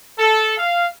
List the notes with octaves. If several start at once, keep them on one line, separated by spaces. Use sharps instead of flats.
A4
F5